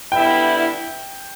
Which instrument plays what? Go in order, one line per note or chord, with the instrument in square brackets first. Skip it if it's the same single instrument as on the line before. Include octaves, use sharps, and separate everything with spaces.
[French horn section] D3 G3 B3 E4 [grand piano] G5